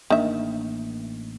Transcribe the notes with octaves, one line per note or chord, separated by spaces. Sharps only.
A1 D#3 A#3 D4 E5